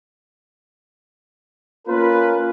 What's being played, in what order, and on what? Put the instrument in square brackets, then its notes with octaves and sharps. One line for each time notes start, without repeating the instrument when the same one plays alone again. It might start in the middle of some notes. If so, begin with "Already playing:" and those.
[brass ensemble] A#3 C#4 F4 A#4 B4